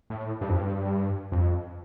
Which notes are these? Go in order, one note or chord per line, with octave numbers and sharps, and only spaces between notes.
A2
G2
F2
G2
F2